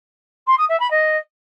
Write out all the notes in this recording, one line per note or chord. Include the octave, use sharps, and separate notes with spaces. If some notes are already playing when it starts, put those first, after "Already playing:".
C6
D#6
E5
B5
D#5